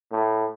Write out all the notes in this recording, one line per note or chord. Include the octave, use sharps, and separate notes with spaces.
A2